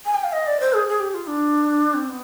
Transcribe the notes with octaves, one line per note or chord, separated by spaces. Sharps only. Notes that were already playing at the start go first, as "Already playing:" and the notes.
G#5
G5
F5
D#5
D5
C5
G#4
G#4
G4
F4
D4
C4
B3